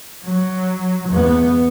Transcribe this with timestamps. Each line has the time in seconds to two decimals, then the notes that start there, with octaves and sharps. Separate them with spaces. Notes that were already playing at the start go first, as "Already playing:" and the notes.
0.24 F#3
1.09 E2 B3